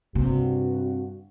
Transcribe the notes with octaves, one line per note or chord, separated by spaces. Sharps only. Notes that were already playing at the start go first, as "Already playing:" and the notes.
G2 C3 F#4